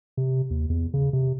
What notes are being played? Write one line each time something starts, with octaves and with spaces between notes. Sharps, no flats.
C3
D#2
E2
C#3
C3